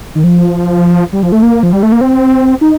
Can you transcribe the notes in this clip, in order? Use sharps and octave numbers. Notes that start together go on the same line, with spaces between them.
D#3
F3
G3
F3
A3
A#3
F3
G3
A3
A#3
C4
D#4